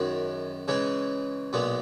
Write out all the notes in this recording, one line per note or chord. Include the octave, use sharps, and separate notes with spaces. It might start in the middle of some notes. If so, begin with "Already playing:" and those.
Already playing: F#2 D#3 G#3
C#3 E3 G#3 C#4 G#4
B1 A#2 G#3 B3